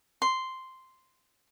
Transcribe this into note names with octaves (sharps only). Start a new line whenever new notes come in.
C6